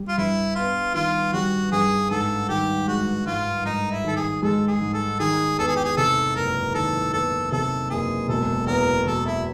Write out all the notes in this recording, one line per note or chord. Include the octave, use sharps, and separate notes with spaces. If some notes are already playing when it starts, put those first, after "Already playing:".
Already playing: G3
F4
G2 E4
B3 F4
D#3 F4
G3 F#4
G2 G#4
G#2 A4
D#3 G4
G#3 F#4
G#2 F4
G#2 D#4
E4
D#3 A4
G#4
G#3 A4
G#4
G#2
A4
D#3 G#4
E2 A4
G#4
G4
G#4
C3 A4
F#1 A#4
D#3 A4
E2 A4
C3 A4
F#1 G#4
E1 A4
E2 A#4
B2 A4
E4